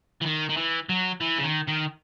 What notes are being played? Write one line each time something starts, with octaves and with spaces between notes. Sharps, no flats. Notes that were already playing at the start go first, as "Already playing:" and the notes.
E3
D#3
D#3
E3
F#3
E3
C#3
D#3
D#3